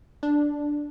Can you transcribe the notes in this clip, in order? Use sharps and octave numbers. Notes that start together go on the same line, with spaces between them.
D4